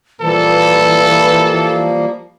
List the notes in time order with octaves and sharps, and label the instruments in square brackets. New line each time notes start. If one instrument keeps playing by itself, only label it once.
[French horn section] A#2 B4 [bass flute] E3 [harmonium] F3 G3 A#3 [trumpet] A4